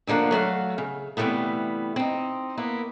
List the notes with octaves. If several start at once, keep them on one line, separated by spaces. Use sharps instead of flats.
D2 D3 F3 A#3 F#5
F#3 A3 F#4 F5
C#3
C3 E3 F3 G3 A3 B3
C4 D#4
A#3 B3 E4